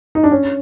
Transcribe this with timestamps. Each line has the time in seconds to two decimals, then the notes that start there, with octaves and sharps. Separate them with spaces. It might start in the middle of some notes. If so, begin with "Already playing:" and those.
0.15 D#4
0.23 D4
0.32 C#4